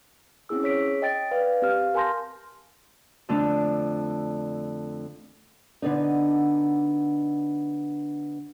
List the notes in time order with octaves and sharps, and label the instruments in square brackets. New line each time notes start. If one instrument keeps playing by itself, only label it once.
[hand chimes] C4 C#4 E4 G#4 E6
G#4 C#5 B6 D7
D#5 G5 A6 D7
B4 D5 F5
C4 G4 F5 F6
A#4 G#5 A5 C6 G6 A#6
[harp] F2 D3 A3 D4
[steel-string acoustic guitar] D3 B3 D4 D#4